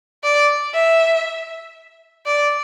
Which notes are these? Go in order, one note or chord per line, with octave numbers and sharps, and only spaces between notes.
D5
E5
D5